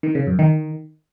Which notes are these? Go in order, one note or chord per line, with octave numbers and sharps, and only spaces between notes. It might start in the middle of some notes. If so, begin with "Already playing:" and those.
D#3
C#3
F#2
D#3